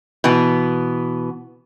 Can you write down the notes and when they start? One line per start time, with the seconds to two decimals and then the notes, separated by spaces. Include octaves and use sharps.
0.24 B2 E3 B3